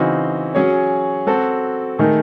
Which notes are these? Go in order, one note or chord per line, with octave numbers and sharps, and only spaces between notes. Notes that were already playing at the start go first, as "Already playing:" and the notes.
Already playing: C#3 E3 C4 D#4 F#4
F#3 C#4 G#4 C#5
F#3 C4 F#4 A4
D#3 A3 D#4 G#4